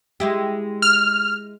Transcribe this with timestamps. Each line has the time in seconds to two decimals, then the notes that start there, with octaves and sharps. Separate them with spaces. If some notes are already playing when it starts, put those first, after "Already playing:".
0.20 G#3 E4 G4
0.82 F6